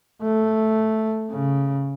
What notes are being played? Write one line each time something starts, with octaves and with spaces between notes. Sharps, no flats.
A3
C#3